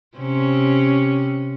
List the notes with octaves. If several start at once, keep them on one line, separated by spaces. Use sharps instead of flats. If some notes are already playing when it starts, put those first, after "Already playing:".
C3 C#4